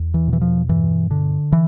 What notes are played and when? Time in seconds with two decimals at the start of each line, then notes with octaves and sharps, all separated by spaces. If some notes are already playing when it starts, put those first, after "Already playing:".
Already playing: E2
0.14 E3
0.28 B2
0.33 E3
0.42 F3
0.69 G2 E3
1.11 D3
1.52 E3